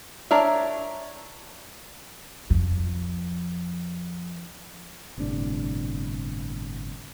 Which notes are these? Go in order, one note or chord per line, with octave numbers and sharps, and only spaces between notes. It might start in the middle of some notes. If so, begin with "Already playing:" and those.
D4 A#4 C#5 E5
F2 F3
G1 A2 C3 D4